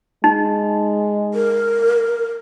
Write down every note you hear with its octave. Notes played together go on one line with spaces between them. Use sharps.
G#3 D#4
A#4